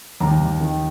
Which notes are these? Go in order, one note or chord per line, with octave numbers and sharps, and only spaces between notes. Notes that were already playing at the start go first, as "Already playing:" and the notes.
D#2 A#5
D#2
D#3